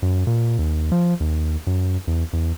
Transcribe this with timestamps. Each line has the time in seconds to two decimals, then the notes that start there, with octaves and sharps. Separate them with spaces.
0.02 F#2
0.27 A#2
0.59 D#2
0.92 F3
1.20 D#2
1.67 F#2
2.07 E2
2.33 E2